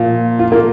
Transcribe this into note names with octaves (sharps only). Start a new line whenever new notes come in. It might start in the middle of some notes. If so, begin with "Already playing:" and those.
Already playing: A#2 F3
F4
A#3